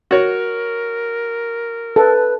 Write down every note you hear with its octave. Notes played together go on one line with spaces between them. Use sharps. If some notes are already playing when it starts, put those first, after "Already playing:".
F#4 A#4 C#5
A4 B4